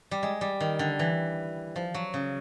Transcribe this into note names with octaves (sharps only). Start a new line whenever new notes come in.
G3
G#3
G3
D#3
D3
E3
F3
F#3
C#3